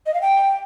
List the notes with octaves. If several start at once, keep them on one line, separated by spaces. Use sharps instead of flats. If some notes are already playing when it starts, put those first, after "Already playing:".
D#5
F5
G5